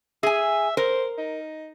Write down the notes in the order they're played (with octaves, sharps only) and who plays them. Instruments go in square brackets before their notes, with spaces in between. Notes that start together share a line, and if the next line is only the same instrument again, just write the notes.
[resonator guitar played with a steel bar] G#4 G#5 [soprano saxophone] E5
[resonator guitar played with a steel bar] A#4 [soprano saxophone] C5
[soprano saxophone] D#4